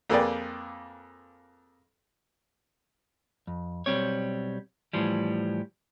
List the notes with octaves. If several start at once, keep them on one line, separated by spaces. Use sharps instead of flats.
F2 A#3 G#4 B4 D5 G5
F2
B1 G3 C4 C#5
A2 E3 F3 G3